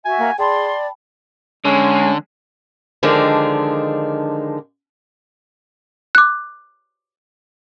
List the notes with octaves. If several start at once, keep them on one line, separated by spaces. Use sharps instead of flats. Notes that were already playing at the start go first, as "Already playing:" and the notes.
F#4 E5 G#5
A#3
G#4 D5 G5 A5 B5 C6
D3 G#3 C#4
D3 D#3 F3 G#3 D4
D6 F#6